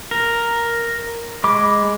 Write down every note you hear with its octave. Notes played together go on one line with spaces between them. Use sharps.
A#4
G#3 B5 D6